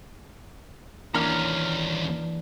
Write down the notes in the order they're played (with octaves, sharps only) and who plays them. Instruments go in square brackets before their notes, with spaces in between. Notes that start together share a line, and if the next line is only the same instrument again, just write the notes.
[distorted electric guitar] D#2 C#4 [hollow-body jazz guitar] E3 A#3 D4 [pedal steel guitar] A#5 F6